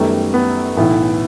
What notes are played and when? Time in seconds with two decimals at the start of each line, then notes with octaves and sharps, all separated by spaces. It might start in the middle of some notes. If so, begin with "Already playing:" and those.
Already playing: F#2 D#3 G3 A3 B3
0.34 B3
0.77 B1 A2 E3 B3